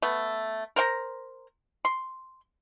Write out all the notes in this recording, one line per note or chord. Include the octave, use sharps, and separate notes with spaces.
A3 B3
A#4 C5 F#5 A#5
C6